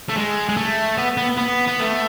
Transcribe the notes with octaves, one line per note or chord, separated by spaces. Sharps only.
A3
G#3
G#3
A3
B3
B3
B3
B3
A3